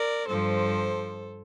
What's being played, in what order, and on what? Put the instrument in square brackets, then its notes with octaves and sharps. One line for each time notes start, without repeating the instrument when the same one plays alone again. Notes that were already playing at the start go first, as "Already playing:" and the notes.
Already playing: [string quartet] A#4 D5
G2 F3 A4 C5